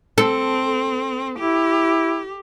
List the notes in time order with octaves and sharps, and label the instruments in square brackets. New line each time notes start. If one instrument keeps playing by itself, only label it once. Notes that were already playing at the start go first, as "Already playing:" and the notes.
[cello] C4 [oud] A4
[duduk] E4 [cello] G4